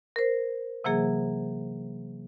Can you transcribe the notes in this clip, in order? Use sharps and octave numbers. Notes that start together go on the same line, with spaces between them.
A#4 C5
C3 E3 F#3 A#3 G#4